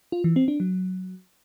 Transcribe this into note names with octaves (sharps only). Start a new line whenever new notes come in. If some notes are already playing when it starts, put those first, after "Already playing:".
F4
E3
C4
D4
F#3